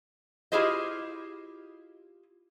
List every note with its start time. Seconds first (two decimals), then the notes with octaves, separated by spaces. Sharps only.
0.52 E4 F4 G4 G#4 C5 D#5